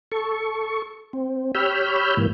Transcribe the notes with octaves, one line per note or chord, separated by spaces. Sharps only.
A4 C#6
C4
G4 C#5 B5 E6 F6 G6
G#2 E3 A#3